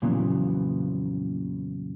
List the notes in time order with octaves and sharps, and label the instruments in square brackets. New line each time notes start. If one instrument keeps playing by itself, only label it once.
[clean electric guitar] F2 A#2 C#3 E3 F#3 B3